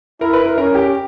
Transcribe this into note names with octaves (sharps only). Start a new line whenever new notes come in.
E4 A#4
B4
A#4
C#4 A#4
G4